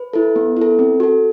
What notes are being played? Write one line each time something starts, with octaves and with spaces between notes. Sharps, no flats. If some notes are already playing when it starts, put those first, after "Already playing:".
Already playing: B4
E4 A4
B3
E4 A4
C4
F#4 A4